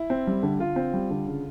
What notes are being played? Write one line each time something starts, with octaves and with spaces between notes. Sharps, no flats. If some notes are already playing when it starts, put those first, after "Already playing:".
Already playing: E4
C4
G3
D3
D3 F4
C4
G3
D3
C#3